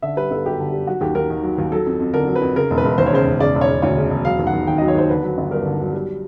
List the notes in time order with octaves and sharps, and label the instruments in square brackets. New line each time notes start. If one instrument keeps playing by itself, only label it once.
[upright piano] D3 E5
G3 B4
G1 A4
F#2 G4
D3
G3
F#3 F#4
D#2 G4
D#2 A#4
D#3
F#3
D#2
F#3 A4
F2
F2
D3 A#4
F#3
B4
F2
C#3 A#4
E1
B4
E1
D#2 C5
C#5
C#3 C5
E1
C#3 D5
E1
C#5
E1
D2 C#5
C#3
E1
F#3 F5
D#2
F#5
D#2
D#3 G5
F#3 D#5
C#5
D#2 C5
D3 B4
F#3
G1
G2 A#4
D3
F#3
G3